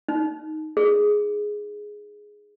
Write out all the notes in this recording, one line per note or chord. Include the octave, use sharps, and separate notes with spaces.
D#4
G#4